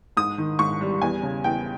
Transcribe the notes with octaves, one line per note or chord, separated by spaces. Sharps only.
G#2 D#6
D#3
G#2 C#6
G3
E2 G#5
C#3
E2 G5